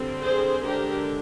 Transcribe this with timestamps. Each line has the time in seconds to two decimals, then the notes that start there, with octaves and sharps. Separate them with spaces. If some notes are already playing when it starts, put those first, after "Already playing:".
Already playing: D3 G3 C4
0.22 G#4 C5
0.65 D3 G#3 D4 G4 A#4